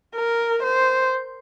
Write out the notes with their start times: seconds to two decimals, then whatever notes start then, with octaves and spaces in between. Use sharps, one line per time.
0.15 A#4
0.63 C5